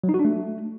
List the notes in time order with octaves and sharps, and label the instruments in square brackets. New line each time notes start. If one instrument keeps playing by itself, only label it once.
[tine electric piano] F#3
D#4
F#4
D4
A3